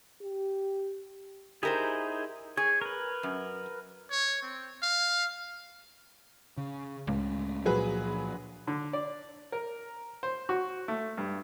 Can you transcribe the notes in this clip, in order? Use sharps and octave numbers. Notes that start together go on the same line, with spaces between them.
G4
D#4 E4 G4 G#4 A#4 C5
G#4 C#5
A#4 B4
F#2
C#5
C4
F5
C#3
C#2 A2 G#3 C#4
A#2 F3 F#3 G#4 B4
D3
D5
A#4
C5
F#4
A3
G2